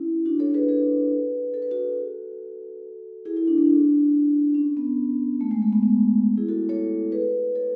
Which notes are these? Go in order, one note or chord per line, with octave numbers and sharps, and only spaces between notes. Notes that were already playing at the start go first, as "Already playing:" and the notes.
Already playing: C#4 E4
D4 F#4
A4 C#5
G#4 B4
G#4 B4
A4
B4
F#4 A4
E4 G#4
E4
D4
D4
C#4
B3
A3
G#3
A3
B3
B3
E4 G#4
F#4 A4
A4 C#5
G#4 B4
A4 C#5